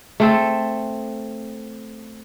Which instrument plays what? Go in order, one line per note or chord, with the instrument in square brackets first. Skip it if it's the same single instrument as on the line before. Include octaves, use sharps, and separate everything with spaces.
[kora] A3 C4 A4